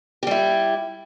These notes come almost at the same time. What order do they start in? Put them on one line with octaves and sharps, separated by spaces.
G4 G3 E4